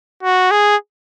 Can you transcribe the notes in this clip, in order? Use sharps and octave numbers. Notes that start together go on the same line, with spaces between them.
F#4
G#4